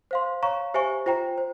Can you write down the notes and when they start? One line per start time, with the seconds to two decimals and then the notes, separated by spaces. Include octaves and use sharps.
0.11 C5 F5 C6
0.43 C#5 F5 A#5 C#6
0.74 G4 C5 E5 G#5 C#6
1.06 F4 C5 G5 A#5
1.38 C5